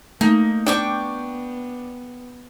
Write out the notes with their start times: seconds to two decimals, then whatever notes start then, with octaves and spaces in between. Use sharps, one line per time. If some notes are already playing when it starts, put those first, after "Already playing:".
0.21 A3 A#3 D#4
0.67 B3 D4 G5 C#6 D6